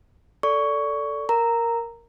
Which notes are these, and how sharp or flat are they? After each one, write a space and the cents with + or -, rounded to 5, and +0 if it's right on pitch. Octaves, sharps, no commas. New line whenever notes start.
A4 +10 D5 -15 C#6 +15
A#4 +0 A#5 -10